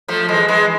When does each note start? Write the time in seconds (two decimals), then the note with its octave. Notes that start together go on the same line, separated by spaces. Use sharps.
0.08 F3 A3
0.29 E3 G#3
0.48 E3 G#3